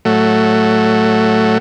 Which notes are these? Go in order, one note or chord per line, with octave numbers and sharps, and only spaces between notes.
A2 F#3 A3